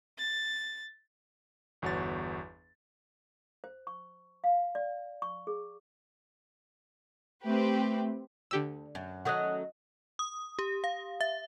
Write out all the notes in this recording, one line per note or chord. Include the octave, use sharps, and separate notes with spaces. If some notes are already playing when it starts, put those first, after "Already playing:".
A6
G1 E2 F#4 C#5 A6
C5
C#6
F5
D5
C#6
G#4
A3 C4 G4 B4
D2 D3 G4 E6
F#2
D#3 F#3 A3 C#4 D#5 F#5 D#6 F#6
D#6
G4
F5
E5